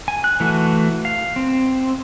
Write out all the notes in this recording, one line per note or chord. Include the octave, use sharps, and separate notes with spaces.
G#5
F#6
E3 A3 F#4
F5
C4